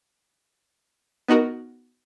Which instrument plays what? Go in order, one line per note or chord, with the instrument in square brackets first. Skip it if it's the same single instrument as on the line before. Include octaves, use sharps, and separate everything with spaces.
[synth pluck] B3 D#4 F#4 A#4